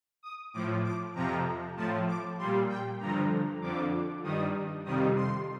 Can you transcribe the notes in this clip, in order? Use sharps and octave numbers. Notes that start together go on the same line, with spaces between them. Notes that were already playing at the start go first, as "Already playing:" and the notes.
D#6
A2 F3 D6
D6
F2 C3 F3 A#5
A2 F3 A5
D6
A#2 G3 C6
G5
G2 D3 F3 A#5
F2 D3 F3 D6
G2 D#3 G3 D#6
F2 C3 D#3 G3 D#6
C6